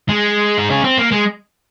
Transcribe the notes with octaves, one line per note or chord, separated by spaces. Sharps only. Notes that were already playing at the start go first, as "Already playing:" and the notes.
G#3
D#4
C#4
C4
A#3
G#3